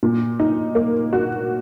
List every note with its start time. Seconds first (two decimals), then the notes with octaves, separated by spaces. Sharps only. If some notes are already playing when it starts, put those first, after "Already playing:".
0.03 A#2
0.40 D#4
0.75 A#3
1.13 F#4